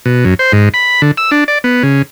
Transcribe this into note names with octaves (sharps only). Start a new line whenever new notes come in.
B2
F#2
C5
G#2
B5
D3
E6
D4
D5
B3
C#3